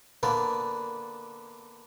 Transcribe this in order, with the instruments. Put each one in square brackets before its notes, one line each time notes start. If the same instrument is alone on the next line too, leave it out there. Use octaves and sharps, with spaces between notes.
[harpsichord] D3 A#3 B3 D5